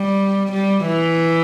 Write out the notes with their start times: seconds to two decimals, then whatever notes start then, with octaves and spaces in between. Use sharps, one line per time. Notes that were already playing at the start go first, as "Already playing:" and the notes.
Already playing: G3
0.52 G3
0.87 E3